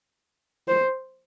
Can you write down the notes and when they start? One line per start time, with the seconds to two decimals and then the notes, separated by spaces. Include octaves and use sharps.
0.68 C5